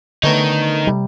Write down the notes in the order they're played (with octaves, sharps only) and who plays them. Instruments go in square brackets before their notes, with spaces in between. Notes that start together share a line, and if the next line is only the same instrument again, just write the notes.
[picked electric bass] D3 [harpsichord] A3 B3 C#5 [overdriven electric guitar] D#4 A#4
[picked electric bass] C3 G3